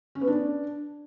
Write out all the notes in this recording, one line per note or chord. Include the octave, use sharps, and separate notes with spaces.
C#4
B3
D4